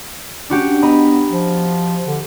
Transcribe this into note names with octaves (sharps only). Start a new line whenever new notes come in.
C#4 D4 F#4 G4
B3 D#5 A#5 B5
F3
D3